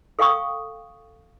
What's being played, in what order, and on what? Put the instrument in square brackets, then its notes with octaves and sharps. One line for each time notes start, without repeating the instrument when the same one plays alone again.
[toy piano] A4 F5 G5 C#6 D#6